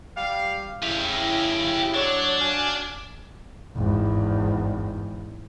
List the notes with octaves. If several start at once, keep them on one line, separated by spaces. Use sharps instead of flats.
G3 G4 F5
C#3 E4 G4 F5
F#3 D4 C#5
F#4 F5 G#5
G#1 E2